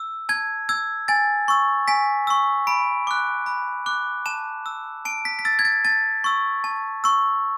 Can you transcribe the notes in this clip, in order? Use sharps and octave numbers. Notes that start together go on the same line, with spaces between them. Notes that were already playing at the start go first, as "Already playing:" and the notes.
Already playing: E6
A5 G#6
E6 G#6
G#5 A6
C#6 E6
G#5 B6
C#6 E6
B5 D7
D6 F#6
B5
D6 F#6
A5 E7
E6
A5 D7
B6
B6
E6 A6
G#6
A6
A5 A6
C#6 E6
A5
C#6 E6